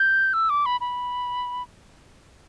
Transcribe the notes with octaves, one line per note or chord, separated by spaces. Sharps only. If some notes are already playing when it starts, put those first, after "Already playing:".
Already playing: G6
E6
D6
B5
B5